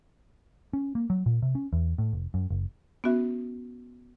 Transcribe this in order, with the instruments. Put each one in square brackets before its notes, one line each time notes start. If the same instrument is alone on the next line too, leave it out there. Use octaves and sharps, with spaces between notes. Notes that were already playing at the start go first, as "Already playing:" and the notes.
[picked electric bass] C#4
A#3
F#3
A#2
C3
C#4
E2
A2
F1
F#2
F#1
[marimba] B3 C#4 F#4 E5